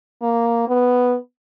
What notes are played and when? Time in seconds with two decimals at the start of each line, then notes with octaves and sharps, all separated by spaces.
0.22 A#3
0.68 B3